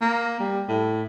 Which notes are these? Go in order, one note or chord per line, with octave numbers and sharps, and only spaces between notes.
A#3
G3
A2